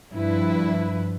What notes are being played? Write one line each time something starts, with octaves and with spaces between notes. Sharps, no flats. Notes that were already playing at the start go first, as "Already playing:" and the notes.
G2 F3 E4 B4